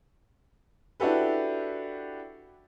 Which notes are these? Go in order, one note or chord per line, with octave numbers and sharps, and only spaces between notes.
D4 E4 F#4 G4 A4 B4